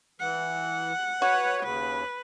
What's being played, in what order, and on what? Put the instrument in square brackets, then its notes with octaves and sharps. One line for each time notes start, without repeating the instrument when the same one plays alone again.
[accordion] E3 [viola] F#5
[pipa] F#4 [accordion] B4 C#5
[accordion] D#2 C#3 [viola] B4